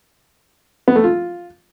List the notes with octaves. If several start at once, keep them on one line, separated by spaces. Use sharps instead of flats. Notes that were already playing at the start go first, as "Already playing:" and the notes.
B3
A3
F4